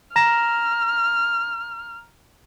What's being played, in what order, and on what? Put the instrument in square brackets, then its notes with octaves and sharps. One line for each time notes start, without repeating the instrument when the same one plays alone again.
[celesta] A#5 A#6 E7 [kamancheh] F6